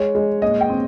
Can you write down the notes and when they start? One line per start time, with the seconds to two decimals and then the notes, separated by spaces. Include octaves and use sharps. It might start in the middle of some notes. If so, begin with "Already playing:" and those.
Already playing: G#3 C#5
0.15 G#3
0.42 A#2 D#5
0.61 G5
0.69 C4